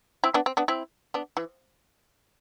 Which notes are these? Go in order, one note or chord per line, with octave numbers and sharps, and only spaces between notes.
C4 E4
B3 D4
C4
B3 D4
C4 E4
B3 D4
E3